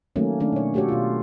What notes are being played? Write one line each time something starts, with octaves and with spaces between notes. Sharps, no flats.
D#3 F#3 A3 A#3 C#4
D#3 A3 C#4 D4
B2 C#5
A3 F#4 G4 A4 C#5
B2 F4